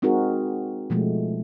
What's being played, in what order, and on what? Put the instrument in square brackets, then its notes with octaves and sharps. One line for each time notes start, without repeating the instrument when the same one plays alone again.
[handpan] G#3 C4 D#4 F#4 G#4 A#4
B2 F3 G#3 A3